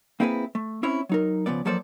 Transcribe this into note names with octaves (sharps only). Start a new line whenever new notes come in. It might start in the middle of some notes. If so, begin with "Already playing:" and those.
A#3 C4 E4 G#4 A#4 B4
A3
C4 C#4 E4 C#5
F#3 D#4 A#4
C#3 F3 B3 D5
F3 F#3 A#3 A4 C5 D5